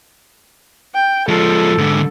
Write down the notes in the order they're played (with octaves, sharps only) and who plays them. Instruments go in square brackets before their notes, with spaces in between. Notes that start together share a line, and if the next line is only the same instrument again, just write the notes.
[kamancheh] G5
[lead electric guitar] F3 G#3 [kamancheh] A4
[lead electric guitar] G#2 D3